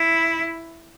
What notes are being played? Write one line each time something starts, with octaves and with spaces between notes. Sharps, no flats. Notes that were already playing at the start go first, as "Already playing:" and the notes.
Already playing: E4